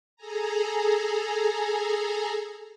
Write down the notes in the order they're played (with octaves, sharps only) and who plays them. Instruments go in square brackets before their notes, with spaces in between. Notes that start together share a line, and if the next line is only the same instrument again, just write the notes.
[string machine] G#4 A4 G#5 A#5